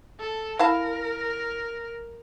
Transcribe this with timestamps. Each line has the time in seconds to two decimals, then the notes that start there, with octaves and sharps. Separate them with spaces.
0.19 A4
0.59 E4 A#4 F5 A5